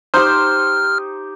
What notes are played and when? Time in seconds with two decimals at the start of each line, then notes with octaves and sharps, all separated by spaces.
0.14 D#4 G4 C5 F6